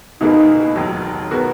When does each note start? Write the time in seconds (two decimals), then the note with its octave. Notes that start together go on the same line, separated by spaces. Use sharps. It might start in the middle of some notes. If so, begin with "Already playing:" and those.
0.21 C#2 B2 A#3 D#4 E4 G#4
0.76 E1 D#2 D#3 F#3
1.31 B2 G#3 B3 F#4 A#4